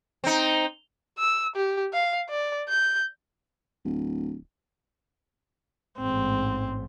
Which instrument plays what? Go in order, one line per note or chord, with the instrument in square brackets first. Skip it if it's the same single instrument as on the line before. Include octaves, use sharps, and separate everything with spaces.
[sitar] C4 D#4
[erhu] E6
G4
F5
D5
G6
[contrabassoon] D1
[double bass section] A1 G#2 [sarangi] C4